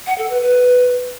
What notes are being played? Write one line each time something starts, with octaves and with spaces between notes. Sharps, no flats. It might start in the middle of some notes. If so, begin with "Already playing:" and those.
F#5
A4
B4
B4